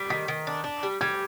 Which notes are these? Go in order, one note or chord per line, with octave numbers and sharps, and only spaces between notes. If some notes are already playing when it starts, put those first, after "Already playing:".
Already playing: G3 B6
D#3 B6
D#3
D4
D4
G3
G3 G#6